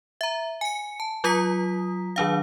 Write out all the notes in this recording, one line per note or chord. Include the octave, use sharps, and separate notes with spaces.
E5 A#5
G#5 C#7
A5
F#3 F4 A#5 D#6 B6
D#3 F#3 D4 F5